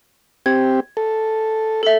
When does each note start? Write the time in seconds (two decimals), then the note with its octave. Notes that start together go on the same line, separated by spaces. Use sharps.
0.46 C4 G4 G#6
0.97 A4
1.83 A4 E5